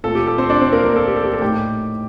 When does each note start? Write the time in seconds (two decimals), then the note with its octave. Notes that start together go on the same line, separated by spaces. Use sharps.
0.04 A#2 A3 C4 F4 A4
0.15 G4
0.27 A4
0.38 C4 C5
0.50 D4 D5
0.61 C4 C5
0.72 A#3 A#4
0.84 A#3 A#4
0.96 A4
1.07 G4
1.16 A4
1.25 G4
1.33 A4
1.42 A2 A3 D#4 G4 G5